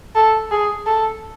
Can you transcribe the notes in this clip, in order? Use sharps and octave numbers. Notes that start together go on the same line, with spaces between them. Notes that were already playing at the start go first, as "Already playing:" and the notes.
A4
G#4
A4